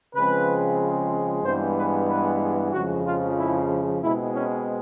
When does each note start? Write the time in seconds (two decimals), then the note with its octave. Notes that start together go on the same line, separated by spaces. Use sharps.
0.14 C#3 F3 G#3 C4 B4
1.44 G2 E3 G#3 B3 C5
1.76 B4
2.08 B4
2.72 F2 C#3 F3 G#3 F#4
3.05 F4
3.37 E4
4.01 B2 G#3 C4 E4
4.34 C#4